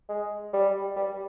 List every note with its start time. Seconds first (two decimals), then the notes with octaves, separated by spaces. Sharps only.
0.09 G#3
0.53 G3
0.96 G3